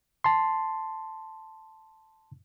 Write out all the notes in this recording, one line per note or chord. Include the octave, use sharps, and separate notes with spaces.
A5 C6